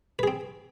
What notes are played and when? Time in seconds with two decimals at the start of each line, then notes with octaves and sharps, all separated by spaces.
0.19 B4
0.23 G#4
0.27 C4